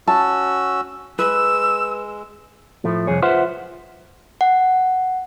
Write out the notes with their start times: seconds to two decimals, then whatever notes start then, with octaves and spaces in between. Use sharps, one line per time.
0.08 C#4 F#4 A5 E6
1.19 G#3 B4 E6
2.84 A2 F3 A3
3.07 C2 F2 G#4 C#5
3.22 F4 B4 C5 E5 F#5
4.41 F#5